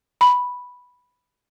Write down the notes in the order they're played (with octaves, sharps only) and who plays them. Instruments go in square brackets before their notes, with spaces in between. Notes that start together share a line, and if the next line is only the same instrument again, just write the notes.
[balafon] B5